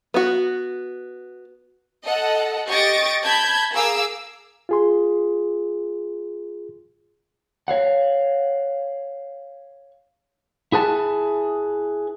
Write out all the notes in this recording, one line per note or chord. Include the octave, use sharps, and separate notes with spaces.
B3 F#4
A4 D#5 F#5
G4 D#5 C#6 A6 A#6 D7
A5 B5 G6 G#6
G#4 A#4 F5 D6 E6
F4 G#4 C6
C#5 F5 F#5
E4 G#4 B4 A5